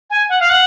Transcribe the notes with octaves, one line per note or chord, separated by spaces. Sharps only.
G#5
F#5
F5
F#5